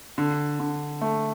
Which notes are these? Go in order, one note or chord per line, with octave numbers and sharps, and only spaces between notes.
D3
D3
A3